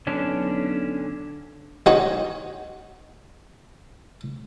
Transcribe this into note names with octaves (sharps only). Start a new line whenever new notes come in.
B1 D3 C#4 D4
D#4 F#4 C#5